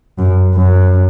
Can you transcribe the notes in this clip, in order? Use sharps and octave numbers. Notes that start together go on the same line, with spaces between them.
F#2
F#2